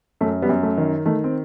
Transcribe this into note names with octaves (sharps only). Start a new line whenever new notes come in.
F#2 A3
G3 B3
F#2
A3
D#3
D#3 A3
C4